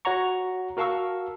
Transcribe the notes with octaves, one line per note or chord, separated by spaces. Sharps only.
F#4 C#5 F#5 A#5 C#6
F#4 A#4 F5 A5 C#6 E6